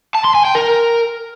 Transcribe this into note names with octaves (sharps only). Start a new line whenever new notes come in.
A5
C6
G#5
G5
A#4